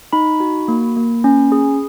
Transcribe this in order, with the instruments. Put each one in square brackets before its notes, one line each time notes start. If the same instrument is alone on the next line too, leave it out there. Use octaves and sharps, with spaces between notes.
[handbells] D#4 B5
F#4
A#3
A#3
C#4
G#4